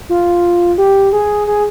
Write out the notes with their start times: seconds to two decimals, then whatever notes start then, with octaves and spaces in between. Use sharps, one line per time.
0.09 F4
0.78 G4
1.13 G#4
1.47 G#4